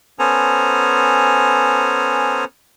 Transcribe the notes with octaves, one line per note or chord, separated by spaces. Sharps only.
B3 C#4 A4 C5 G#5 A#5